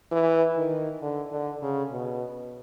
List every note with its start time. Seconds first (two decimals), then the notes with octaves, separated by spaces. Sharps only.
0.12 E3
0.57 D#3
1.02 D3
1.32 D3
1.62 C#3
1.92 B2